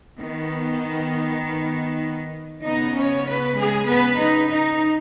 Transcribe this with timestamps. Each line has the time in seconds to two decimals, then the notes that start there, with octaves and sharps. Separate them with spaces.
0.19 D#3 B3
2.63 C#3 B3 D#4 D#5
2.94 C#4 C#5
3.26 B3 B4
3.56 G#3 G#4
3.86 B3 B4
4.18 D#4
4.48 D#4